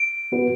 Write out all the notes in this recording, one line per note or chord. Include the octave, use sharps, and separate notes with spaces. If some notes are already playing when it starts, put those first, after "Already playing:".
Already playing: D7
B3 F#4 B4